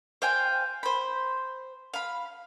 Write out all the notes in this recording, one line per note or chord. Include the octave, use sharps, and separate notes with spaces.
C5 F5 G5 G#5
C5 B5
F5 B5